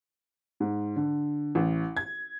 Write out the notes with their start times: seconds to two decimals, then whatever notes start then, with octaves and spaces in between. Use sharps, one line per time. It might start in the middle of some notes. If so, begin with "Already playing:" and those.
0.60 G#2
0.96 D3
1.55 A1
1.97 G#6